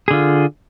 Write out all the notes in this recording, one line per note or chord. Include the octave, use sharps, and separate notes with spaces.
D3 F4 G#4